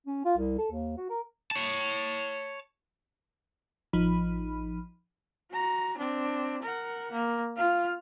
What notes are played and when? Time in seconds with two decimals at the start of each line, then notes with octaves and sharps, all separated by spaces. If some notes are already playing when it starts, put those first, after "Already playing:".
0.07 C#4
0.25 F4
0.37 C2
0.58 A4
0.72 D#2
0.97 F#4
1.10 A#4
1.51 C#5 A5
3.93 A1 F3 D#4 B5
5.51 F#4 A#5
5.97 C4 D4
6.63 A#4 F#5
7.12 A#3
7.57 F4 F5